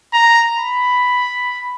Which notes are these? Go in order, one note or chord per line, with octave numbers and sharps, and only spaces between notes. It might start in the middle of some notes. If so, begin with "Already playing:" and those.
A#5
B5